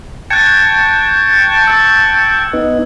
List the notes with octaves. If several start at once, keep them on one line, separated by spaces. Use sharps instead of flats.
G5 A5 C#6 F#6 G#6
E6
B3 D#4